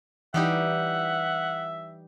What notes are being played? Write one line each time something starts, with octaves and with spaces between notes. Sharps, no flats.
E3 G3 D#4 G4 E5 F#5